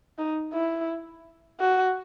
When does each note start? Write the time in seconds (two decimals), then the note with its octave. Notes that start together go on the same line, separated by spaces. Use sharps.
0.18 D#4
0.53 E4
1.60 F#4